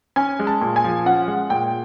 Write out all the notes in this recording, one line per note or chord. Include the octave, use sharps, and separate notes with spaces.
C#4 G#5
G#3
A5
A#2
G#5
F3
C#4 F#5
G#3
A#2 G5